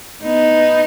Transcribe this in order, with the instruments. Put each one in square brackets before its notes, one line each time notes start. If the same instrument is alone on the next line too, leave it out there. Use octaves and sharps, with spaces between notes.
[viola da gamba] B3 D#4